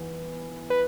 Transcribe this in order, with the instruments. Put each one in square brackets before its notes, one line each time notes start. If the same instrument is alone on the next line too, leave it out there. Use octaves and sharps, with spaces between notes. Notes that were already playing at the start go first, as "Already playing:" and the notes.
Already playing: [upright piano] E3 B3
[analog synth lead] B4